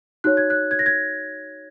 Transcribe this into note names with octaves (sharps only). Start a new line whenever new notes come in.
D#4 F#4 C#5 F#6
G#6
F#6
G#6
A#6
G#6